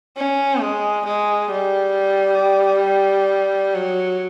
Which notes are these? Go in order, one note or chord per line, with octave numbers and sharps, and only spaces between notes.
C#4
G#3
G#3
G3
F#3